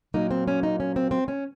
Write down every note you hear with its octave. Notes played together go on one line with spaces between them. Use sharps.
A#2 F#3 A#3 D#4
C4
C#4
D#4
C#4
C4
C4
C#4